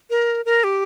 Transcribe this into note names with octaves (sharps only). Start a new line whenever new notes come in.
A#4
A#4
G4